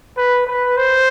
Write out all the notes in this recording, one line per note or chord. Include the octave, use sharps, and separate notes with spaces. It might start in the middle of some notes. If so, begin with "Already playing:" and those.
B4
B4
C5